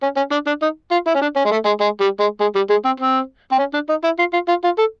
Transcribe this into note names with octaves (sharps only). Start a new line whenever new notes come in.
C#4
C#4
D4
D4
D#4
F4
E4
C#4
D4
C#4
G#3
A3
G#3
G#3
G3
G#3
G#3
G3
G#3
C4
C4
C4
C#4
D4
D#4
E4
F4
F4
F4
F4
A4